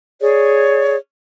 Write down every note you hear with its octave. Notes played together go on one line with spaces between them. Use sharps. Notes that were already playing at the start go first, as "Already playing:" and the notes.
G#4 C#5 D5